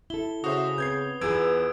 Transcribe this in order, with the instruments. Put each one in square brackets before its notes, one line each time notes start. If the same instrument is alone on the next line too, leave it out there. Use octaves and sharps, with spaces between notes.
[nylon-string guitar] E4 A4 [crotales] G7
[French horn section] C#3 [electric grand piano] F#4 C5 E5 [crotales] D#6
[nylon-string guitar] B3 C4 B4 [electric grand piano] G6 G#6 C7
[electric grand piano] E2 E6 G#6 [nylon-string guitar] B3 F4 G#4 [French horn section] B4 [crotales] D7